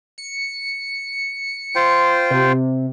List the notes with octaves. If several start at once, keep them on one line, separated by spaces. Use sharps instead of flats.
C#7
F4 C5 G5
C3